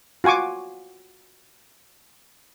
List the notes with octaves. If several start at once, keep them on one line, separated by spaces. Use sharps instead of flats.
F4 F#4 G#5 C#6 D6